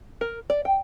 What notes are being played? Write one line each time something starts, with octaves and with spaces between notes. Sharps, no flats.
A#4
D5
G5